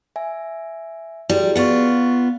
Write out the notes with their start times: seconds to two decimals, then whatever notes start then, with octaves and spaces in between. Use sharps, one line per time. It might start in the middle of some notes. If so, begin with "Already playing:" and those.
0.16 E5 G#5
1.29 G3 E4 F#4 G#4
1.56 B3 F4 C#6 A6 C#7